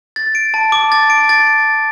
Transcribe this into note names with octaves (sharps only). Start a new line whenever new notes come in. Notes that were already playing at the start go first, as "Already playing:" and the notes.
A6
D7
A5
D6
A6
D7
A6